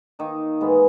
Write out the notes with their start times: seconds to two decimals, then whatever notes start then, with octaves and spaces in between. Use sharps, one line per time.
0.19 D#3 A#3 D#4
0.61 G#2 E3 G#3 B3